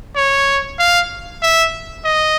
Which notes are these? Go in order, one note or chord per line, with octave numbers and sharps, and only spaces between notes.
C#5
F5
E5
D#5